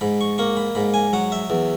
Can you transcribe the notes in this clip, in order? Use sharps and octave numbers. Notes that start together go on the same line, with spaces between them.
G#2 B5
C#6
A#3 C#6
B5
G#2 B5
G#5
F#3 F#5
E5
E2